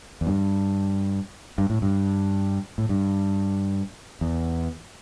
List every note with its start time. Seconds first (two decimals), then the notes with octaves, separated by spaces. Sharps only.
0.21 E2
0.27 G2
1.58 G2
1.70 A2
1.82 G2
2.78 A2
2.89 G2
4.21 E2